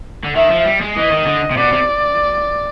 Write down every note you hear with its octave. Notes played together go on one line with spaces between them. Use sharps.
D3
D#3 E5
F3
G3
G#3
E3 D#5
D#3
D3
C3
B2 D5
C3